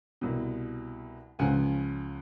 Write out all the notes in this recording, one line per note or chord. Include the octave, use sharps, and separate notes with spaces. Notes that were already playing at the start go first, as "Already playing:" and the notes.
C2 B2
C#2 C#3 F3 F#5 G#5